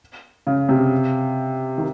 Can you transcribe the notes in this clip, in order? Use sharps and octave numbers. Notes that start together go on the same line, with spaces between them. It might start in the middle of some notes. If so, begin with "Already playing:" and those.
C#3
C3
D#3